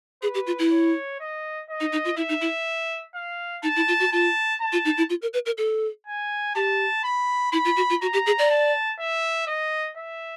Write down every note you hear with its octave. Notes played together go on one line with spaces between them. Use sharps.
G#4 B4
G4
F4
E4
C#5
D#5
D#5
D#4
D#4
F4
E4 E5
D#4
E4
F5
D#4 A5
E4
F4
F#4
F4 A5
A5
F4
D#4
E4
F4
A#4
B4
A#4
A4
G#5
G4 A5
B5
E4 B5
F4
F#4
F4
F#4 A#5
G4
G#4
D5
A5
E5
D#5
E5